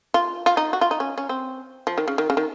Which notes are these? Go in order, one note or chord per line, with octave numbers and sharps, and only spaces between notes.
F4
F4
D#4
F#4
F4
D#4
C#4
C#4
C4
F3
D#3
C#3
D#3
C#3
D#3